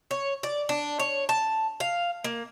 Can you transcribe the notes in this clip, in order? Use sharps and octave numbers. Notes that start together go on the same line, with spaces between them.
C#5
D5
D4
C#5
A5
F5
A#3